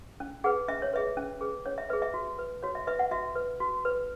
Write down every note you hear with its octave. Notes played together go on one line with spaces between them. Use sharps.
C#4
G#4 B4 F#5
C#4 E5
C#5
G#4 B4 E5
C#4
G#4 B4
C#4 C#5
E5
G#4 B4 E5
E5
F#4
B4
F#4 C#5
E5
B4 E5
F#5
F#4 E5
B4
F#4
B4